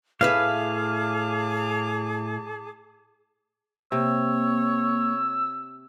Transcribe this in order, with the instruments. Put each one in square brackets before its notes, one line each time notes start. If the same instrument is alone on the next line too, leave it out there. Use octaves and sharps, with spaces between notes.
[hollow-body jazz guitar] A2 B4 E5 [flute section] G#4 A5 D6 [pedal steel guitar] F5
[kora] C3 [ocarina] A#3 [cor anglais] C#5 [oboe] E6